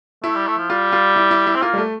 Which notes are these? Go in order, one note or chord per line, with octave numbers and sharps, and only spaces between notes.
A3 E4
G3
A3
F3
G3 F4
F4
E4
E4
E4
C4
A#3 F4
G3
A3